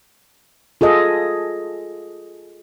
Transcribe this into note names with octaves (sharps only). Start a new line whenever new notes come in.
F4 G#4 A4 D#5